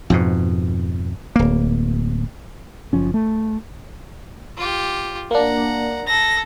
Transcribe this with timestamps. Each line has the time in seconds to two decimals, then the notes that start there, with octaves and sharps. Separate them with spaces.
0.10 F2 G#2 B2
1.36 D1 A#3
2.93 F#1 F3 C#4
3.14 A3
4.57 F4 G4
5.31 A#3 D4 F#5 A#5
6.07 A4 A#6